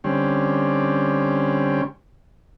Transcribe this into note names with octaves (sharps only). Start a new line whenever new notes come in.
D3 G3 C4 C#4